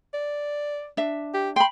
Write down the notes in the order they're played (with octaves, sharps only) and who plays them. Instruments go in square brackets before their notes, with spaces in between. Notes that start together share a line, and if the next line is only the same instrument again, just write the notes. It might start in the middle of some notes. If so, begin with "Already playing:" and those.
[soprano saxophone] D5
[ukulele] D4 E5
[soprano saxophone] G4
[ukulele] G5 B5 [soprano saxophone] C6